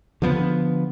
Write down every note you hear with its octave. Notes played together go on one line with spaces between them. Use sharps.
D3 F3 B3